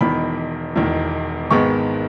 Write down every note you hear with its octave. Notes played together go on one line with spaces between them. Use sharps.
E1 E2 D#3 B5
E1 E2 D#3
G#1 G#2 D#3 G#3 B3 C#6